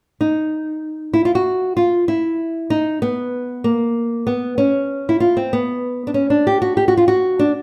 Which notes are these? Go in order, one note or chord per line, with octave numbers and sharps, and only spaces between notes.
D#4
E4
F4
F#4
F4
E4
D#4
B3
A#3
B3
C#4
E4
F4
C4
B3
D4
C#4
D4
G4
F#4
G4
F#4
F4
F#4
D4